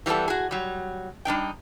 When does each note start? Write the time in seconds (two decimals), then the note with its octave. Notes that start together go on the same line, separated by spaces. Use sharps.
0.06 E3 G3 B3 D#4 A4
0.28 F#4 G#4
0.51 F#3 G3
1.25 G3 D4 D#4 G5